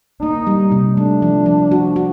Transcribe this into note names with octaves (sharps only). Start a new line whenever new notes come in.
A#3 D#4
G3
C3
A3 D4
F3
F3
F#4
F#4